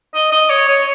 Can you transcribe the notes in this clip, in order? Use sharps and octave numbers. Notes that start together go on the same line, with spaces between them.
D#5
D#5
C#5
C#5